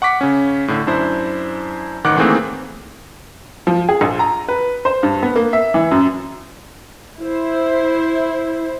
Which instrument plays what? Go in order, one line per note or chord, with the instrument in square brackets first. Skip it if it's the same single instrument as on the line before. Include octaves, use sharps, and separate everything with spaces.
[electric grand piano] F#5 C#6 D6 B6
C#3 C#4
A2 D3
F#2 D4 E4 C5
A1 D#3 F#5 D6 F#6
D#3 E3 A3 A#3 C4 G#4
[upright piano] F3
G#4
A#1
A#5
B4
C5
G2
B3
A#3
E5
E3
F#2
[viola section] E4 C5